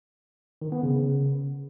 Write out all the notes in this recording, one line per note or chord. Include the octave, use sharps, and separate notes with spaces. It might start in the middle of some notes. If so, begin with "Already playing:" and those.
D#3
B3
C#3